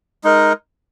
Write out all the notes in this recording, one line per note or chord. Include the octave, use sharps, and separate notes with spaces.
G#3 D#4 A#4